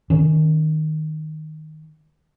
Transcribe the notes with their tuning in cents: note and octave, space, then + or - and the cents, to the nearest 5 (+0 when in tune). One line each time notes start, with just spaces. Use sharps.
D#3 +0 C#4 +0